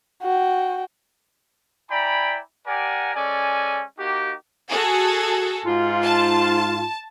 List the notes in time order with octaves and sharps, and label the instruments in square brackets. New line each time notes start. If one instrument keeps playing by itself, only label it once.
[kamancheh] F#4 G5
[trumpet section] E4 D5 G5 G#5 A#5 B5
G4 A#4 D5 F#5 G#5
G#3 C#4 A4 D5 G#5
A#3 D#4 F#4 G4
[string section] F#4 G#4 A4
[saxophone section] G#2 F4
[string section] A5